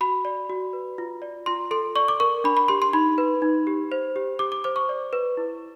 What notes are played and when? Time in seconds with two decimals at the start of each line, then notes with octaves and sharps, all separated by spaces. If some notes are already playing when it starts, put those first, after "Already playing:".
0.01 F#4 B5
0.25 D5
0.50 F#4
0.73 B4
0.98 F4
1.22 D5
1.46 F4 C6
1.71 A4 C6
1.96 D5 C#6
2.08 D6
2.20 A#4 C#6
2.44 D4 B5
2.57 B5
2.68 G4 C6
2.82 C6
2.93 D#4 B5
3.18 B4
3.42 D#4
3.67 G4
3.92 C5
4.16 G4
4.39 G4 D6
4.52 D6
4.64 C5 D6
4.76 C#6
4.89 D5
5.13 B4
5.37 E4